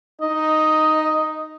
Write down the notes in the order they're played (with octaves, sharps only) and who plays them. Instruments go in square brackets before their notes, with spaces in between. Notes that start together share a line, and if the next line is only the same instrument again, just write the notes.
[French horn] D#4 [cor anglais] D#5